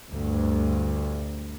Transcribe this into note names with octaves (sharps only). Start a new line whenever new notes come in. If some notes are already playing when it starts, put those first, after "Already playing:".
D2 G2